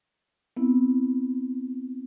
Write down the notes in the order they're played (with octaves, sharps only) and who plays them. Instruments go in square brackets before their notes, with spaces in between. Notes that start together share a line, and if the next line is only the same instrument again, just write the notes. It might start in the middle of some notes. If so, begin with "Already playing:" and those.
[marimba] B3 C4 E4